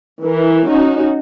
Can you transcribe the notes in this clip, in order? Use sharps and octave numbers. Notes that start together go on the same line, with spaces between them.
E3 A#4
C#4 D#4 F#4